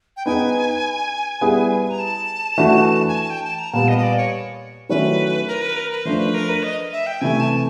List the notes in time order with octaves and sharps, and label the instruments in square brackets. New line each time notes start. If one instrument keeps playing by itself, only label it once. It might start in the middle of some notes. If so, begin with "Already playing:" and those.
[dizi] G5
[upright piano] B3 D#4 G#4 B4 [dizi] G#5
[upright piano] G3 B3 E4 G#4
[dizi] A#5
A5
[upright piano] E3 A3 D4 F#4
[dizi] G#5
A5
G5
A5
A#5
[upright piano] A#2 G3 B3 [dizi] A5
[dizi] D#5
D#5
D5
C#5
[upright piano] D#3 F#3 A3 C#4 E4 [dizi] B4
[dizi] A#4
B4
A#4
B4
[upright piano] F3 A3 D4 [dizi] C5
[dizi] B4
A#4
B4
D#5
E5
G5
[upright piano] C3 E3 A3 [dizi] G#5
[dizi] A5